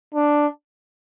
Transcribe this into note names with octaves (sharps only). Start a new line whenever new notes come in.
D4